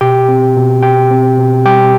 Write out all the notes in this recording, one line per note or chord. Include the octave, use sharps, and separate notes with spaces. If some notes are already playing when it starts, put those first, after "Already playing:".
B2 G4 G5
C4
B2
B2 G4 G5
C4
B2
G3 G4 G5